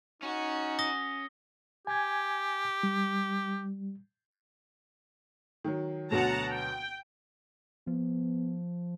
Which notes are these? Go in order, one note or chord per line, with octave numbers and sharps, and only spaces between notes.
C#4 D#4 F#4
D#6 A#6 G7
G4 G#5 G#6
G3
D#3 F#3
D2 B2 F#3 F#5 A5 A#5
G5
F3 B3